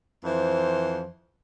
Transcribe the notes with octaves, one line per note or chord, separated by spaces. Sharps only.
F2 E3 C5